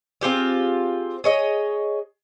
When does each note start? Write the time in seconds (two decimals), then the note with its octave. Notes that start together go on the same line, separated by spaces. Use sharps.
0.21 C4 F4 G4 G#4
1.24 G#4 C#5 D#5